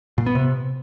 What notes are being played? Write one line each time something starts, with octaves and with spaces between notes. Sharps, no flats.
A#2
B3
C3